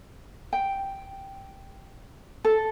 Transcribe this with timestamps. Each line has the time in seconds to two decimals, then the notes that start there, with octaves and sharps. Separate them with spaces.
0.53 G5
2.45 A4